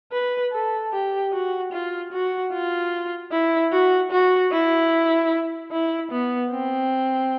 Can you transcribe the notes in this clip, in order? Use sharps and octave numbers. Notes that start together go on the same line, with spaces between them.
B4
A4
G4
F#4
F4
F#4
F4
E4
F#4
F#4
E4
E4
B3
C4